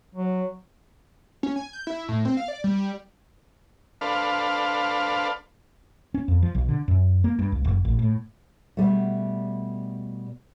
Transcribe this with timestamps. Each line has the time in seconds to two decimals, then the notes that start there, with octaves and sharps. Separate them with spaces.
0.15 F#3
1.43 C#4
1.56 G#5
1.73 G6
1.87 E4
2.08 A2
2.25 C4
2.37 F5
2.48 D5
2.64 G3
2.78 G3
4.01 D4 A4 B4 C5 F5
6.14 C#4
6.28 F2
6.43 F3
6.55 B1
6.69 D3
6.88 F#2
7.24 A#3
7.39 G2
7.52 C#2
7.65 F#1
7.85 A1
7.99 A2
8.77 B2 G3 A3